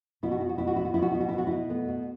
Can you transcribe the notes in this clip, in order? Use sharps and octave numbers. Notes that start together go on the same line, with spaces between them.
B2 E4
F#4
B2 E4
F#4
B2 E4
F#4
B2 E4
F#4
B2 E4
F#4
B2 E4
F#4
E4
B2
F#4
B2 E4
A3 B3
B2